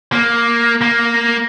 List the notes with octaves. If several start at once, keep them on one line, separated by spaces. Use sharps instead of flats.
A#3
A#3